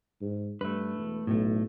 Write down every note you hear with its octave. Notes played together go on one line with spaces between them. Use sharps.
G#2
G2 A3 B4
E1
B1 A2 A3